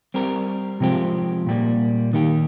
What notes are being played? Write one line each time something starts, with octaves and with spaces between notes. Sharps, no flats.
G3 C4 G4 A#4
C3 F3 G#3 C4 G4
A#2 G3 A#3
D#3 A#3 D#4 G4